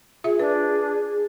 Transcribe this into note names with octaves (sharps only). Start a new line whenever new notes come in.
F4 G#4 E5
D4 B4